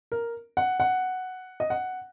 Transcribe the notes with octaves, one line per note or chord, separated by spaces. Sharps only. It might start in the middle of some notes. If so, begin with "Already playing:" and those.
A#4
F#5
F#5
D#5
F#5